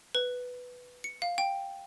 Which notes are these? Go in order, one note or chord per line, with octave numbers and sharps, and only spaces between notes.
B4
C#7
F5
G5